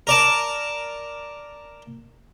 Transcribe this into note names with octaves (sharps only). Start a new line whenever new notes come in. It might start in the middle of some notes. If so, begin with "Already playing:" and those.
A#4 D5 A5